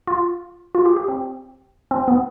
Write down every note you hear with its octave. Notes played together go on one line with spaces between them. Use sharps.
F4
F4
G4
G4
C4
C4
B3